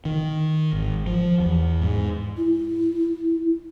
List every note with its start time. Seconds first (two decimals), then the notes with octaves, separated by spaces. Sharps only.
0.05 D#3
0.73 G#1
1.07 F3
1.40 E2
1.81 G#2
2.37 E4